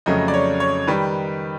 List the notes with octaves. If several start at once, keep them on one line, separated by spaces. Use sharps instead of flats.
F2 C#3 F#3 A3 D#5
D5
C#5
C#5
D#3 G3 B4